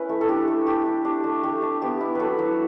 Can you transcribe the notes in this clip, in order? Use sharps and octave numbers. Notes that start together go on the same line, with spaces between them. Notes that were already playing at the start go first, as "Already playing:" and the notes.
Already playing: C#4 E4 B4
A3
A4
D4 G4
A3
A3 G4
D4
D4 G4
A3
A3 G4
D4
B3 G4
E4
F#3 A4 B4
F#3